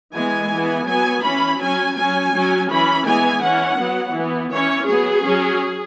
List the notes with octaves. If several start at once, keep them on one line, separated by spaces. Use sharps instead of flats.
E3 G#3 B3 G#5
E3 B3
F#3 B3 G#5
E3 C#4 B5
F#3 C#4 G#5
F#3 C#4 G#5
F#3 C#4
E3 C#4 B5
E3 G#3 B3 G#5
E3 C#4 F#5
F#3 B3
E3 B3
E3 C#4 C#5
F#3 B3 G#4
F#3 C#4